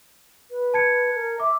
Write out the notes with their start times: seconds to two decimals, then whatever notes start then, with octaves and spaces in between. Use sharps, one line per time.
0.51 B4
0.74 A5 G#6 C#7
1.15 A#4
1.40 E5 D6